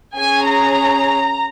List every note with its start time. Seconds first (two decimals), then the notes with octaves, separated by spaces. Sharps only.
0.17 C#4 G#4 G#5
0.45 A#5